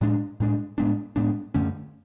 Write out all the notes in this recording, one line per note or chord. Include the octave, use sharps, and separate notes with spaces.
A2 G#3 D4
A2 G#3 D4
A2 G#3 B3 D4
A2 G#3 B3 D4
F#2 D3 A3 C#4